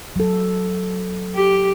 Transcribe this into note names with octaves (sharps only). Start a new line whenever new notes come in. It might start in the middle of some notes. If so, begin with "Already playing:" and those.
F#3 A4
G4